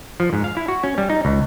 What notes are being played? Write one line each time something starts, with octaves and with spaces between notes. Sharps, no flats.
F3
G#2
F5
E4
F#4
C#4
G3
D#4
C#2